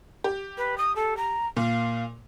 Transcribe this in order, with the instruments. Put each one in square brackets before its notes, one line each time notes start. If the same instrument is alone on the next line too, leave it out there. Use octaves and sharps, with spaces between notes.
[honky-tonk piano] G4
[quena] B4
D#6
A4
A#5
[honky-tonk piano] A#2 [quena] F5